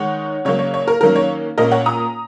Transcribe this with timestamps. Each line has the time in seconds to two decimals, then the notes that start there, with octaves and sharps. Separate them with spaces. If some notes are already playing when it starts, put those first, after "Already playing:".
Already playing: D#3 G#3 D#4 C#5 F#5
0.45 C#3 F#3 A#3 C#5
0.59 C#5
0.74 C#5
0.87 A#4
1.01 D#3 F#3 A#3 C#4 A#4
1.16 C#5
1.58 A#2 A#3 C#4 A#4 D#5
1.71 C#5 F#5
1.86 A#5 D#6